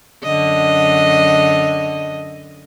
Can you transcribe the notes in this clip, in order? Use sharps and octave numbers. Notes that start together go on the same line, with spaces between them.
F#2 D3 D#5